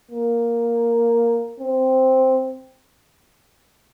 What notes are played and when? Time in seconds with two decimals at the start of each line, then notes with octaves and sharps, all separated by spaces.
0.11 A#3
1.60 C4